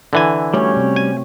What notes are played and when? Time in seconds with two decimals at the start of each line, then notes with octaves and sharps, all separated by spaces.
0.13 D3 E3 G#5
0.54 G3 A3 C#4 F#4 C#5
0.76 C3 C4
0.96 G#5